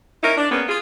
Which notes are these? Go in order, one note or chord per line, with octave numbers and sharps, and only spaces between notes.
C#4 D#4 E4 A#4
D4
G#3 A#3 B3 C#4
F4 G#4